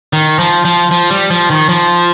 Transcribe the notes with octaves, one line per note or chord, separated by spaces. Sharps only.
D#3
F3
F3
F3
G3
F3
D#3
F3